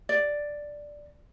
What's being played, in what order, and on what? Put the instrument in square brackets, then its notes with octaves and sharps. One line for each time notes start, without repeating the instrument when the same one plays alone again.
[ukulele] D5